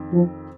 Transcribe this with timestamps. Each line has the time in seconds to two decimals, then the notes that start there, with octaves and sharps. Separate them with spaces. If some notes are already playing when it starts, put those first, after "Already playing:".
Already playing: F2 D#3 C4
0.12 F3